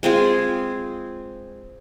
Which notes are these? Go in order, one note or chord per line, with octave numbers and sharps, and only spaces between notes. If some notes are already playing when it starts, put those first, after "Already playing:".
G#3 C4 F4 G#4